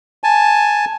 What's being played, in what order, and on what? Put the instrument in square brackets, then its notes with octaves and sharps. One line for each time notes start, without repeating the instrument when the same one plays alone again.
[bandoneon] G#5 A5